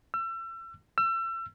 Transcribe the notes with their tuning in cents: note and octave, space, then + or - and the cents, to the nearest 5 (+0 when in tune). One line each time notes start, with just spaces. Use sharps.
E6 +35
E6 +35